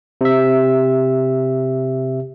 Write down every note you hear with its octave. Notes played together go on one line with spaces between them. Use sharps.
C3 E5